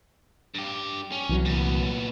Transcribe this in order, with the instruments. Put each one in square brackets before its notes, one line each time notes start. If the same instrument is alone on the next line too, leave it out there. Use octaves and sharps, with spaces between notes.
[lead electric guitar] G2 G4
C#4
[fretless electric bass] C2 E3 F#3
[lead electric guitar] A#2 B3